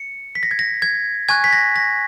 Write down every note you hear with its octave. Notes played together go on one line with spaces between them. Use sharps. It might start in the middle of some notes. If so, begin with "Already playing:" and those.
Already playing: C#7
B6
A#6
G#6
A#6
G#6
G#5 C#6 F#6 G#6
B6
A#6
A#6